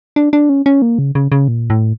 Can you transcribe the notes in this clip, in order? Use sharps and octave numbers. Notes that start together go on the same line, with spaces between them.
D4
D4
C#4
C#4
A#3
C#3
C#3
C#3
A#2
A2